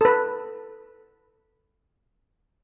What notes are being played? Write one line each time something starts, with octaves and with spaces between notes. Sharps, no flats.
A4 B4